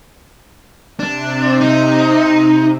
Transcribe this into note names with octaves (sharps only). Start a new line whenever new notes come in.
C3 D4
D#4